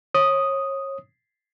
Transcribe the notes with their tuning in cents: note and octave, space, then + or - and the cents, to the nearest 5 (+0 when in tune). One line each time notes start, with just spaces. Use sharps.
C#5 -30 D#6 +0